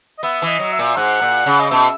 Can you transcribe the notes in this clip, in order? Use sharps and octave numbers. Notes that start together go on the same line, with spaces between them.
D#5
B3 E5
E3
D#5
F#3
E5
A#2
G#2 F#5
A#2
C#3
D#5
B2 E5